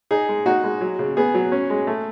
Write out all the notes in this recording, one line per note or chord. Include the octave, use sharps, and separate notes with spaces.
D#4 G#4
G#3
D#4 F#4
G#3
F#3
C#3
B3 G#4
F#3
C#4
G#3
A3